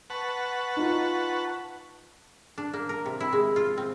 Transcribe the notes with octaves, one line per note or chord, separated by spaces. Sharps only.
B4 F#5 A5 C#6
D#4 F4
D4
A#3
A#4
C3
E4
G#3
F4
C4